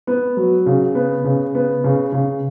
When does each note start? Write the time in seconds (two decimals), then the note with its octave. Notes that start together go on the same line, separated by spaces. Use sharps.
0.07 B3
0.37 F#3
0.66 C#3
0.95 B3
1.24 C#3
1.55 B3
1.84 C#3
2.13 C#3